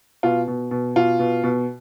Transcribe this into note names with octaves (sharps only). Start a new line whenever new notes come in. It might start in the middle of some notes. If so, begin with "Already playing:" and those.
B2 F4
B2
B2
B2 F4
B2
B2